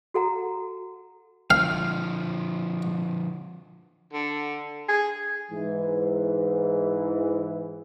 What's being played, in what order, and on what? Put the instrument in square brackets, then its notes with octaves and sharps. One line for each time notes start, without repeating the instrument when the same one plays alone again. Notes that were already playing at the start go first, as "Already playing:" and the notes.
[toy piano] F#4 A4 F#5 A#5
[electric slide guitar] D3 F3 [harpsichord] F5
[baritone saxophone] D3
G#4
[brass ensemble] G#2 E3